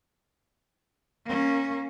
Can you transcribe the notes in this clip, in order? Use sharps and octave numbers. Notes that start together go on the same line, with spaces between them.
A#3 C#4